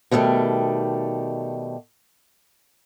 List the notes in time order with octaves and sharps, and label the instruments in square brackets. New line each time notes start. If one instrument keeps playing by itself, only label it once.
[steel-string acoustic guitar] B2 D#3 F#3 G3 A3